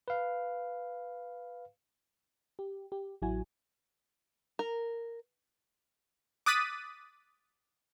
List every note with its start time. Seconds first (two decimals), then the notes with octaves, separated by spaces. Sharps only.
0.08 B4 F5
2.59 G4
2.92 G4
3.22 A1 F#3 E4 F#4 G#5
4.59 A#4
6.46 D6 D#6 F#6 A6 B6 D#7